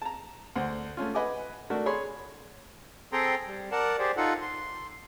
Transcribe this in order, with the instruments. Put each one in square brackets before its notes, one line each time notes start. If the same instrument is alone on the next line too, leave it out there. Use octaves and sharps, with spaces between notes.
[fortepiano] A5 A#5
D2 C5 F#5
A3 C#4 F4
B4 D#5 F#5 G#5 D6
A3 D4 F#4 A#4
G#4 C#5 B5 C6
[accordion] C4 G#4 A4 G5 A#5 C6
G3
A#4 D5 F#5 A5
G4 G#4 C5 D5
D#4 F4 A4 F#5
C6